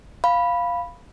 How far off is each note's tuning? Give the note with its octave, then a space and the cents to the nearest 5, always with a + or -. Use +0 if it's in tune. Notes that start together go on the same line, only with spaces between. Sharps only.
F5 +0 B5 +0